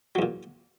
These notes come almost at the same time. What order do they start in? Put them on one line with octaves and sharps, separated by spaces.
F#3 E2 A#2